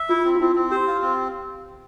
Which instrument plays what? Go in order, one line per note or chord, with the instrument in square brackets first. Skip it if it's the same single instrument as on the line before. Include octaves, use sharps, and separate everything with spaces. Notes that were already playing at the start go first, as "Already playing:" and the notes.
Already playing: [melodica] E5
[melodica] E4 [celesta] F4
[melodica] C4
[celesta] F4
[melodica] C4 [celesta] E4
[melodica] C4
[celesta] G4 [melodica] C5
[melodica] F4
C4